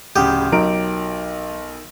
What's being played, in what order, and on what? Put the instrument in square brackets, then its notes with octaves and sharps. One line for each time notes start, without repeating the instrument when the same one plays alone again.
[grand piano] D1 C#3 [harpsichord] G4 [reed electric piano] F#5 D#6 G6
[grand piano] B1 D7 [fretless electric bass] F#3 [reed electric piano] D#4 A#4